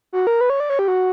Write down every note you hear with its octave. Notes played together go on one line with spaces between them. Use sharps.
F#4
A#4
B4
C#5
D5
C#5
G4
F#4